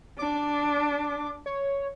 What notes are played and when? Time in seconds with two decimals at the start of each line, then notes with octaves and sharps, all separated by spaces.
0.19 D4 D6
1.46 C#5